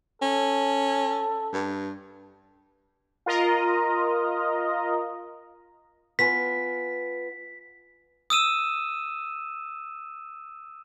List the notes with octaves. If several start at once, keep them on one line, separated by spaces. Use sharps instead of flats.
C#4 A4
G2
F4 A#4 D#5 A#5
B3 F4 G#5 B6
D#6 E6 D#7 E7